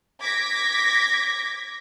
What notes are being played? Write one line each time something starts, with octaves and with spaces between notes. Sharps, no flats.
D6 G#6 A#6 B6